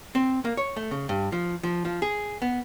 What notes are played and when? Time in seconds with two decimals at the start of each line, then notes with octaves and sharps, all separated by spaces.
0.15 C4
0.45 A#3
0.57 C#5
0.77 A3
0.91 C#3
1.09 G2
1.32 F3
1.63 F3
1.85 F3
2.02 G#4
2.42 B3